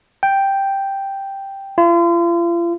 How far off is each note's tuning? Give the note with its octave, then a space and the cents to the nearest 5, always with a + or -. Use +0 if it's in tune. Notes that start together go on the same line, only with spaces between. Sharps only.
G5 +0
F4 -40